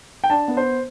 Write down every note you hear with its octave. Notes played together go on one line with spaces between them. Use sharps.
G5
D4 A5
B3
C5